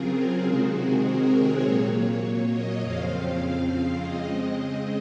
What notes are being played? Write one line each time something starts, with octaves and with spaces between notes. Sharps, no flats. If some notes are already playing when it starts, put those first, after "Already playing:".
Already playing: C#3 F#3 C4 F4 G#4 A#4
G#4
C3 D#3 G#3 C4 F#4
G#4
A#4
C#5
A#2 F#3 A#3
C#5
D#5
F2 C#3 F3 C4 F5
C#3 G#3 C4 D#5
D#5